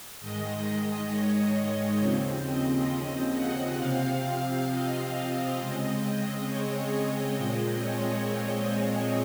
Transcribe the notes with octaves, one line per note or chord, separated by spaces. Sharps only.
G#2 D#3 G#3 D#5
C#5
D#2 C#3 F3 C4
D#5
F#5
C3 F3 C4 F5
D#5
C#3 G#3 C4
C#5
D#5
A#2 F3 G#3 C4
C#5
G#4